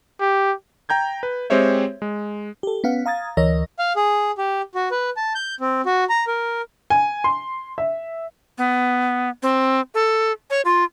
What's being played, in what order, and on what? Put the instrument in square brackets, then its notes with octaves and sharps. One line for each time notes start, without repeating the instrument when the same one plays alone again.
[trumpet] G4
[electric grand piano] G5 A#5 G6 G#6
B4
G#3 C4 G4 C5 C#5 E5
G#3
[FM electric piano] G4 A4
B3 C#4 F5 F#5
F5 A#5 D#6 G#6 A6
D2 E3 A#4 C#5 D#5 A#6
[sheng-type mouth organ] F5
G#4
G4
F#4
B4
A5
G6
C4
F#4
A#5
A#4
[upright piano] G#5
C6
E5
[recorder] B3
C4
A4
C#5
F4